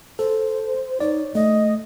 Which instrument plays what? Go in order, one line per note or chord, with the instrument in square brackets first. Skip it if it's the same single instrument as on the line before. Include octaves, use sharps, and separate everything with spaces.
[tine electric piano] A4 [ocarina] C5
[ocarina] D#4 [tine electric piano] C#5 D5
[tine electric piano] A3 [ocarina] D#5